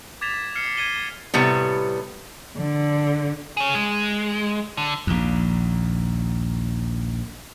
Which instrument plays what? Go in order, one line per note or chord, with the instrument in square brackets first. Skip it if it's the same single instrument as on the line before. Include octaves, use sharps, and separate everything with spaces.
[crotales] D6 G#6 A6 B6 E7 F7
F6 C7 C#7
G#6 C7 D#7 E7 G7
[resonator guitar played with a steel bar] A2 C3 G3 B3
[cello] D3
[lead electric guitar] G#4 C#5
G#3
D3
[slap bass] A#1 D#2